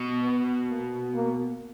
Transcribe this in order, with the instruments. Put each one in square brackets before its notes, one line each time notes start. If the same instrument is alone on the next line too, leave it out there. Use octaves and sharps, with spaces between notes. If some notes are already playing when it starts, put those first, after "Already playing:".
Already playing: [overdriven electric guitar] B2
[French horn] B3
A#3
A#3